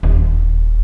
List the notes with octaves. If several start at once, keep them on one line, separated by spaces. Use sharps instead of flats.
D#1